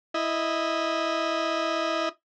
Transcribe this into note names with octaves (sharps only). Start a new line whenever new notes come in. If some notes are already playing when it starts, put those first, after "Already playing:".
E4 D#5